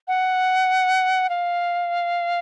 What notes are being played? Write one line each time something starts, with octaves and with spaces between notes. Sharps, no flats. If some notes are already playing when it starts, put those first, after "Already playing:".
F#5
F5